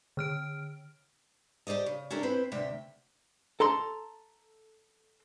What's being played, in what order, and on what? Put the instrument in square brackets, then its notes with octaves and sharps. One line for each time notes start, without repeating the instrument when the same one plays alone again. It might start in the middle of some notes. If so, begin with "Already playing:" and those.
[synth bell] D3 F6 D7
[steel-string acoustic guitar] G4 A4 C5 D5 D#5
C#3
C#4 D4 E4 G4 A4 A#4
C4 E4 B4 C5
D2 C3 E5 G5
[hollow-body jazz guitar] A4 A#5 C6